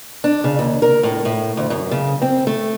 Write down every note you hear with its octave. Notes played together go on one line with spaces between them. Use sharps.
D4
C#3
D#2
A#4
A2
A2
D2
F#2
C#3
C4
A3